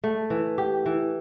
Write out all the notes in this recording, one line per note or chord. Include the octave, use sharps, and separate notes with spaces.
A3
E3
G4
E3